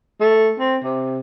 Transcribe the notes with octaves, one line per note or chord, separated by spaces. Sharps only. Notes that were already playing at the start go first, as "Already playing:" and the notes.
A3
C4
C3